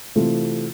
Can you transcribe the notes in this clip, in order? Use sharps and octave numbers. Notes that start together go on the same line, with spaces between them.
C3 E3 A3 C4 F4